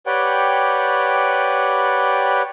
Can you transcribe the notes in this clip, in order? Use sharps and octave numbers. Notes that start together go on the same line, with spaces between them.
G4 B4 C#5 D5 F#5 G5